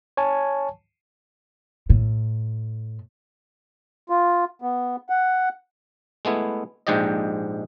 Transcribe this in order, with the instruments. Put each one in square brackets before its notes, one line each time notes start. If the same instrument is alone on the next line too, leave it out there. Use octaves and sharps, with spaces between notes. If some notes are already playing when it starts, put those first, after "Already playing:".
[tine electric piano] C#5 G#5 A5
[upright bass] A2
[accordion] F4
B3
F#5
[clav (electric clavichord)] G#3 A3 B3 E4
A#1 G#2 G#3 G4 D5 D#5